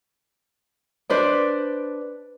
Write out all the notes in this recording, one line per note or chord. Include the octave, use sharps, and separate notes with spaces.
D4 B4 C5 D5